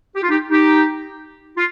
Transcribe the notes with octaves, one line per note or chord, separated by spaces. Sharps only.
G4
F4
D#4 G4
D#4 G4
F4